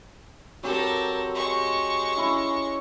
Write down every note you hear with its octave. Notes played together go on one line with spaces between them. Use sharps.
F#3 C4 G4 A4 A#4
G#3 C#6
C#4 E4